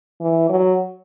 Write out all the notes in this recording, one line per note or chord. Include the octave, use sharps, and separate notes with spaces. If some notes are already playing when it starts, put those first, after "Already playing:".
E3
F#3